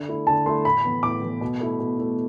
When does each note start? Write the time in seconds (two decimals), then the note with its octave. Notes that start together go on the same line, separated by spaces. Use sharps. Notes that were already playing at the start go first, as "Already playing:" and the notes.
Already playing: D3
0.08 A3 E4
0.27 D3 A5
0.46 A3 C6
0.49 E4
0.65 A2 B5
0.84 E3 B3
1.03 A2 D6
1.23 E3 B3
1.41 B2
1.60 A3 E4
1.80 B2
1.99 A3 E4